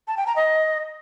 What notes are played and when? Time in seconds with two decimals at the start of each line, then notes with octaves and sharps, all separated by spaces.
0.08 A5
0.17 G5
0.26 A#5
0.36 D#5